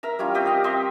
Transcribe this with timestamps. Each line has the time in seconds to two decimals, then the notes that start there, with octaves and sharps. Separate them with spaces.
0.03 A#4 E5 A#5
0.19 G3 C#4 E4 F4
0.34 C4 G4 G5 D#6
0.46 D#5 F5
0.64 C4 D#5 E5 C6